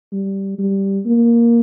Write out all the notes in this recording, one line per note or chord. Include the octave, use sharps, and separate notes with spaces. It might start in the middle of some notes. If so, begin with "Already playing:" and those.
G3
G3
A#3